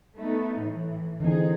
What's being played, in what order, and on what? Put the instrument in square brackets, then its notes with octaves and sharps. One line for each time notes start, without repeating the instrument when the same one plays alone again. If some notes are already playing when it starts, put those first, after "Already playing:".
[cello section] A3 B3 D#4
A2 E3
[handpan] D3 E3 C4 [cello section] D#4 G#4